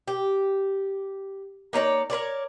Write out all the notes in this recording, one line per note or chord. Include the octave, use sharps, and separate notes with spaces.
G4
A#3 D#4 C#5 D5
A#4 B4 C#5 D5